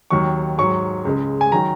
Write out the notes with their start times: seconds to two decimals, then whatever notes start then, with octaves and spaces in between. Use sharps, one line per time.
0.10 D#2 D#3 F#3 C#6
0.58 G#2 F#3 C#6
1.05 C#2 C#3 G#3
1.41 G#5
1.52 D#3 F#3 A#5